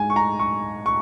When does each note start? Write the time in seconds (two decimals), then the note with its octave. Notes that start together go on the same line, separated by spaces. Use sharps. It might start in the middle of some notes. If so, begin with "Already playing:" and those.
Already playing: G#2 G#3 G#5
0.10 C#6
0.16 A#5
0.39 C#6
0.86 C#6